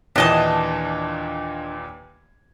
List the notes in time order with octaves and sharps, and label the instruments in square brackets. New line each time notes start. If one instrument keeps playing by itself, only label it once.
[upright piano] D#2 A#2 E3 [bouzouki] D4 D#5 A5